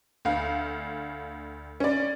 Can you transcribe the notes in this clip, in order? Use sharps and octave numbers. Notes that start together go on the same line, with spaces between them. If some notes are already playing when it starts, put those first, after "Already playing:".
D2 F5
C#4 D5